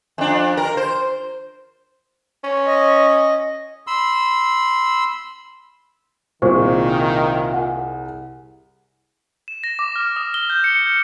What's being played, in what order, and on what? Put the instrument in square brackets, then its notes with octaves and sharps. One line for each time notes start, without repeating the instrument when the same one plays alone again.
[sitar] F2 D4
A#4
C5
[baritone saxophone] C#4
[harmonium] D#5
[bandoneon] B5 C6 E6
[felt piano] C2 G#4 [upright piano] A#2 [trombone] D#3 [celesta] C5 C#6
[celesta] F#5 G#5
[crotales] E7
A#6
D6
F6
D#6
G7
G6
C#7
G6